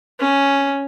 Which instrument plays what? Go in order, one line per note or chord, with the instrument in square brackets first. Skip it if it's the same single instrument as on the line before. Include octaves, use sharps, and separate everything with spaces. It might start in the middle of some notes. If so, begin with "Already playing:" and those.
[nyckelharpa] C#4